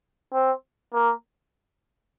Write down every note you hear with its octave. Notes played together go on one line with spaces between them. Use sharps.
C4
A#3